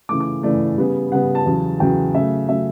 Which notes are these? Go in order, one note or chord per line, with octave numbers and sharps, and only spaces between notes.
C#3 E3 A3 D6
D6
C#3 E3 A3 D5
C#3 G3 B3
C#3 G3 B3 F#5
A5
E2 C#3 F#3
E2 C#3 F#3 G5
C#3 F#3 A3 E5
C#3 F#3 A3 E5